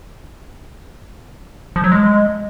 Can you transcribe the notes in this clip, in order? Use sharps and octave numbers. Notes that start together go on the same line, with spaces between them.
F3
F#3
G#3